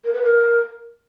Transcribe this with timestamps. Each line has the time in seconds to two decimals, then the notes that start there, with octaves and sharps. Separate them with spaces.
0.04 A#4
0.13 B4
0.23 A#4